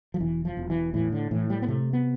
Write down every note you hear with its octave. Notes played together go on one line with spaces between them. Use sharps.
F3
E1 E3
F3
E1
E3
A2 E3
D3
A2 E3
G3
B3
C3 A3
B3